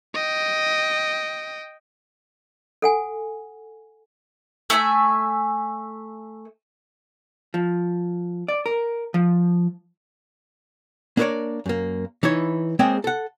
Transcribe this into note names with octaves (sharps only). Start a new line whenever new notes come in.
D#5 G5
A4 F#5 G#5
A3 E5 F#5 G#5
F3
D5
A#4
F3
A#3 D4 A#4 B4 C#5 D5
F#2 A#3
E3 D#4 E4 C#5
G#3 A#3 C4 G#4 C#5 G5
A4 F#5